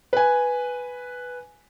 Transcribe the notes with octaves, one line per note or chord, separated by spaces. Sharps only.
B4 G#5